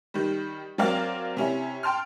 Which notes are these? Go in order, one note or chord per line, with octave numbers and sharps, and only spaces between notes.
D#3 G3
F#3 C4 A#4 D5 F5
C3 C#4 E4
G5 A5 C6 F6